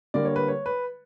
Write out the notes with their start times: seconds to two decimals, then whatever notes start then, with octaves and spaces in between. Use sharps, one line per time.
0.14 D3 G3 A#3 D5
0.25 C#5
0.36 B4
0.48 C#5
0.66 B4